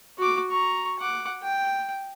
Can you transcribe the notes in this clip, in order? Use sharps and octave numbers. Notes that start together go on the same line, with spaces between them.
F#4 D6
A#5 C#6
F#5 D6
G5